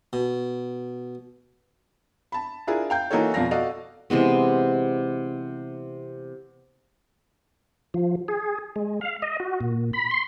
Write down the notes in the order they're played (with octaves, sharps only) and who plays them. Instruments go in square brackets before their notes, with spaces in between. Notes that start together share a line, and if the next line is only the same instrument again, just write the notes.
[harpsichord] B2
[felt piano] A5 B5
D4 E4 F4 G#4 A#4
F5 G5 G6
E3 A#3 D#4 F#4 A4 C#5
F2 B2 F3 D5 F5 A#6
F#4 A4 D5 D#5 F5
[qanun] C3 E3 G#3 B3
[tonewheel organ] F3
G#4
G#3
F5
D#5
F#4
A#2
B5
C6